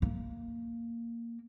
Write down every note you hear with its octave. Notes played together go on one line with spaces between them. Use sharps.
A#3